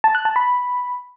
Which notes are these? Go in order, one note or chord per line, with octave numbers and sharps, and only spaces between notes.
A5
F#6
A5
B5